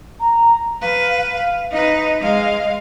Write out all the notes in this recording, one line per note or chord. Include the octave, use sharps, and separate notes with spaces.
A#5
B4 F5
F5
D#4 B4 D#5
G#3 F5